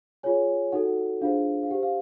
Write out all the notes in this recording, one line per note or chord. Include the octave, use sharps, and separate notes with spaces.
F4 G#4 C#5 G#5
D#4 F#4 A4 F#5
D4 F4 G#4 C5 F5
F5
G4 C5 F#5
F5